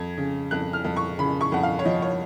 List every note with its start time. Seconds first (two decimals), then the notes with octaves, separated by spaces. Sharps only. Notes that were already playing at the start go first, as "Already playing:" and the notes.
Already playing: F2 G#6
0.17 C#3
0.51 F2 F#6
0.73 F6
0.84 F2
0.96 C#6
1.19 C#3 B5
1.41 C#6
1.52 F2 F#5
1.63 F5
1.79 C#5
1.85 F3 D#5
2.02 C#5